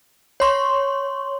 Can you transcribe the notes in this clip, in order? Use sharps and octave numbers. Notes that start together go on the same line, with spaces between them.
C#5 C6 C#6